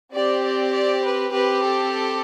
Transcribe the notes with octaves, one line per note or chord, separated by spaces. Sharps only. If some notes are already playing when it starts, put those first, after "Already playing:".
C4 G4 D5
D5
D5
B4
C4 G4 B4
A4